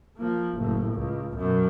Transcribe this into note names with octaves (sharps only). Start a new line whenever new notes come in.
F3 A#3
F#1 A2
C#2
F#2 B2